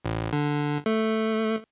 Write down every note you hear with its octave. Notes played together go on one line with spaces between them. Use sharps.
A1
D3
A3